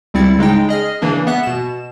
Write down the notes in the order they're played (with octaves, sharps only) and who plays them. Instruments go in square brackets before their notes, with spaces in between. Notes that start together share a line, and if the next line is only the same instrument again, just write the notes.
[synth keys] C#2 G3 C4 E4 A6 C#7
C#3 G#3 D#4 G5
G#4 D#5 F6
C#3 E3 A#3 D4
B3 E5 F#6
B2 E7